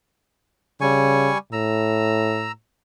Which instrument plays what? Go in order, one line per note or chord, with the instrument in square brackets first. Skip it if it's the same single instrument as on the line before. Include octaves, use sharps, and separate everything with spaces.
[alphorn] C#3 [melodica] G3 G#5 C#6
[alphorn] A2 [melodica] A#5 E6